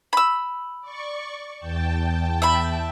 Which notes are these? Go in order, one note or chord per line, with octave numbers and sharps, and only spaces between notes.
B5 E6
D5 C#6
E2 G5 A5
E5 B5